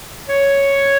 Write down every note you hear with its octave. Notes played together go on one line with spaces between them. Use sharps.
C#5